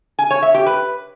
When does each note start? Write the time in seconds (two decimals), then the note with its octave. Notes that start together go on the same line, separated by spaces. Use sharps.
0.19 G#5
0.31 C#5
0.43 E5
0.54 G4
0.66 B4